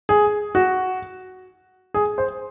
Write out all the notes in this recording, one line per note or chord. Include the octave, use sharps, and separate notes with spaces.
G#4
F#4
G#4
C5